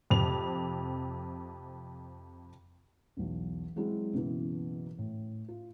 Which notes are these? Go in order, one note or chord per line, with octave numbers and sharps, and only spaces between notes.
F2 C3 F7
B1 E2
F#3 G#3 C4 E4 F#4
F#1 B2 E3 E4
A2
F4